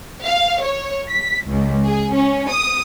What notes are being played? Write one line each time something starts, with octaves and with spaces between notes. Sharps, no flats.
F5
C#5
B6
C#2
G#4
C#4
D#6